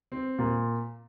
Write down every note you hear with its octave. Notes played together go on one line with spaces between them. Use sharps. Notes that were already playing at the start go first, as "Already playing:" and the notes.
C4
A#2